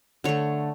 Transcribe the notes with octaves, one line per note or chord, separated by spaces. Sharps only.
D3 A3 C#5